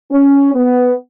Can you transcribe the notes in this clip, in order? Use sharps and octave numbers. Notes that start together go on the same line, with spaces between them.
C#4
B3